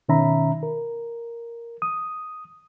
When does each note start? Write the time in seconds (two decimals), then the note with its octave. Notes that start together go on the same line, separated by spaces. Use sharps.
0.09 B2 D#3 C#4 E5 A#5 B5
0.63 A#4
1.82 D#6